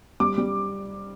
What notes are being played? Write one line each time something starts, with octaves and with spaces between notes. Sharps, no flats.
G3 D6
G3